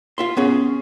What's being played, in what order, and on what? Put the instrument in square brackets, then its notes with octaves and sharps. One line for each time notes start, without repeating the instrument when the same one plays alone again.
[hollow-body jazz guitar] F4 E5 C6
B3 C#4 G#4